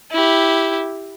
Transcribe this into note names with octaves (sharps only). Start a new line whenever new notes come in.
E4 G4